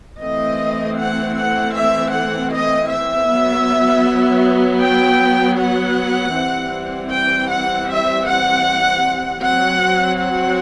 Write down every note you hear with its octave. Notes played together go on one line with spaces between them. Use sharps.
E3 A3 C4 D#5
F#5
F#5
E5
F#5
D#5
E5
F#3 B3
G5
F#5
E3 G3 C4
G5
F#5
E5
F#5
F#3 C4 F#5
F#5